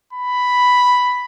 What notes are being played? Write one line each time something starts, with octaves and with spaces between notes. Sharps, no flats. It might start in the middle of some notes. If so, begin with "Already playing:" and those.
B5